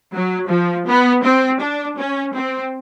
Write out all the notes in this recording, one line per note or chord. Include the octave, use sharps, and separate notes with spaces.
F#3
F3
B3
C4
D4
C#4
C4